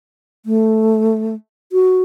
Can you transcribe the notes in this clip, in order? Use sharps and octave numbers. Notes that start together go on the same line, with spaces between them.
A3
F#4